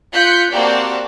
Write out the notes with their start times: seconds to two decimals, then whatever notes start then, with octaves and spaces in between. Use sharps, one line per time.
0.13 F4 F#6 G6 B6 C#7
0.51 A#3 C4 F#4 G4 D5 A5